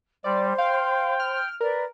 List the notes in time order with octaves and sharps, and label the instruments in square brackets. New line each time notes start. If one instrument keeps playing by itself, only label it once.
[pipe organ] G3 [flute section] C5 C6 [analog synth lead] D5
[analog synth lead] F5 [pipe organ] G5
[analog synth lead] F6
[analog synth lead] A#4 [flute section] B4 D5